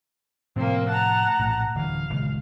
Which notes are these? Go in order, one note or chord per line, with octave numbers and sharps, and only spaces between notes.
A2 C3 F3 A#3 C4
F#5 A5 A#5
A#1 A2
D1 D3 E3 F5
D#1 C#2 C#3